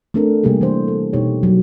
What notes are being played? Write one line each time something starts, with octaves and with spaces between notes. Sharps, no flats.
A3 C4 D4 A4 A#4
C3 G3 A#3 G4 G#4
E3 D4 C5
A4
B2 D#4 G4 C#5
F#3